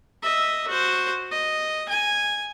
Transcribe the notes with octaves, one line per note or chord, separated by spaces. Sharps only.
D#5 E5
F#4 C5
D#5
G#5